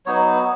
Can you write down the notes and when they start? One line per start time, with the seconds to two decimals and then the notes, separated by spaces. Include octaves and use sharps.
0.06 F#3 B3 D#4 C#5